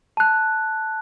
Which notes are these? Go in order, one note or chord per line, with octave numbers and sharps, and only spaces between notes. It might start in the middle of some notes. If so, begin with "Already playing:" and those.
A5 F#6